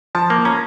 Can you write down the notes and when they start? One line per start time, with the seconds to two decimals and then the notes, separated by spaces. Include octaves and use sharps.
0.15 F3 A5
0.30 A#3
0.45 C#4 A#5